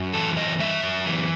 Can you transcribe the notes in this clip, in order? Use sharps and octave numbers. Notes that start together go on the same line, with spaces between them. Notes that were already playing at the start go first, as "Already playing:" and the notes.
Already playing: F#2
E3 A4
F#2 D#5
G3 E5
F#2
E3